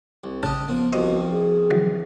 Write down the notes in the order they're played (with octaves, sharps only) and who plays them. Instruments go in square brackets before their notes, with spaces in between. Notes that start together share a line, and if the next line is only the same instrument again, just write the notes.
[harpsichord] C2
[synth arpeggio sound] A1 C#3 A5 [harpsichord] D4 G4 D#5
[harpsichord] F3 A#3 [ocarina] B3
[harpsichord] C2 G2 F3 [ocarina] F#4 [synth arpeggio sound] C5 D#5
[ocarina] G#4
[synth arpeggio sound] D3 E3 F#3